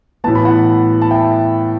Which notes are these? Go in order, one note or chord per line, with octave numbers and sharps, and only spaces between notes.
A2 E3 B3 A5
B5
F#5 A5
A5
E5 G5